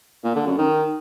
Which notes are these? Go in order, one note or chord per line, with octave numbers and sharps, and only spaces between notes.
A#2
D3
F#2
D#3